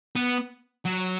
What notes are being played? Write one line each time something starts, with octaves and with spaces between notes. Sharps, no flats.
B3
F#3